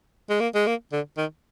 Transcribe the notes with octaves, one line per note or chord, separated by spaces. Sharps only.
G#3
A#3
G#3
A#3
D3
D#3